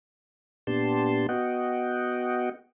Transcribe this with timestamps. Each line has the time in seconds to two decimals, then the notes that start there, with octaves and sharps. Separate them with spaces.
0.67 A#2 B3 D4 G4 A5 C6
1.29 B3 F#4 D#5 F#5 G5